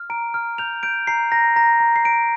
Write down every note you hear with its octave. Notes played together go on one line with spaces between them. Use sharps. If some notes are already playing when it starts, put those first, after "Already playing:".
Already playing: F6
A#5 D7
F6
G6 F7
G6 D7
A#5 C7
A#5 A#6
A#5 A#6
A#5
C7
A#5 D7